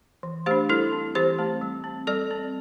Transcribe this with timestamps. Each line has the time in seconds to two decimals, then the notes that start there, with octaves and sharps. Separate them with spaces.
0.23 E3
0.46 A3 D4 G4 C5
0.69 G3 E4 A4
0.92 C4
1.15 E3 G4 C5
1.38 A3 C4
1.62 G3
1.84 C4
2.07 G3 A4 D5
2.31 C4